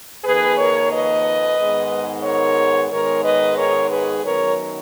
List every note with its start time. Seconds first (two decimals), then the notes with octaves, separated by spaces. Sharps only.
0.24 F2 D#3 A#3 G#4 B4
0.58 A#4 C#5
0.91 B4 D#5
1.58 G#2 D#3 G#3 B3
2.24 A#4 C#5
2.91 G#2 D#3 G#3 B3 A#4 C#5
3.24 B4 D#5
3.57 A#4 C#5
3.90 G#4 B4
4.24 F#2 D#3 F#3 B3 A#4 C#5